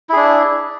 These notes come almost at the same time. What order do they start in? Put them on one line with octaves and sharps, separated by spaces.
E4 G#4 D4